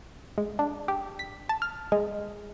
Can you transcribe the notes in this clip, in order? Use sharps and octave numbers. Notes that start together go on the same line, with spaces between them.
G#3
D4
G4
B6
A5
F6
G#3